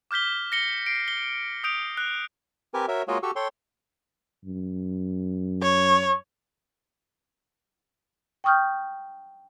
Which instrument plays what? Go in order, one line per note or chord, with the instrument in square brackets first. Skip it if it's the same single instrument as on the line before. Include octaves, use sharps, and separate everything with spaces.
[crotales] D6 F6 G6 B6 G7
A#6 C#7 G7
C7 D7
G7
D#6 G6 D7 F7
F#6
[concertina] C4 G4 A#4 B4 G#5
F#4 A#4 C#5 E5
G#3 A#3 F4 F#4 C#5 D#5
F#4 G4 A4 C#6 E6
A4 C#5 G5 C6
[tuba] F#2
[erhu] C#5
[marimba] G5 C#6 D#6 F6 G6